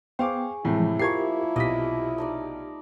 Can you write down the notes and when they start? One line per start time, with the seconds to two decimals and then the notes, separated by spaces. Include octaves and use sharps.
0.19 B3 G#4 C5 F5 G5 C#6 D6
0.65 A2 C3 E3 F3 G#3 A3 E4
0.99 F3 A3 A#3 G4 A#4 C#6 G#6 C7
1.56 B1 C3 G4 D5 D#5 B5 B6
2.18 A3 D#4 D5